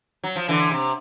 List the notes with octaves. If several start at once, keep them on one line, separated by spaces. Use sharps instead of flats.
F#3
F3
D3 E3
C3